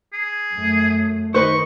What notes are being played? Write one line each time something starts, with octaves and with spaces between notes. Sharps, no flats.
G#4
F#2 A3
D#3 D#4 B4 C5 C#6